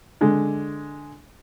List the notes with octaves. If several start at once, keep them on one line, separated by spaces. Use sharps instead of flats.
D3 G#3